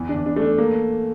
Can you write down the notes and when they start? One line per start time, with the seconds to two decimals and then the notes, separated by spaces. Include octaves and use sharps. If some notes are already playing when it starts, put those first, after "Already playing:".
Already playing: E2 E3
0.09 D4
0.15 E2
0.26 D4
0.36 A3
0.42 D4
0.58 A#3